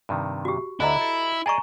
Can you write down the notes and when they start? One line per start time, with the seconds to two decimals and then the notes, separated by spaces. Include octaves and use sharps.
0.09 G2 C3 D#3
0.45 F#4 G4
0.80 D2 D3 E4 C5 D#5 A#5
1.01 A4
1.46 G#4 D5 D#5 G#5 A#5 C#6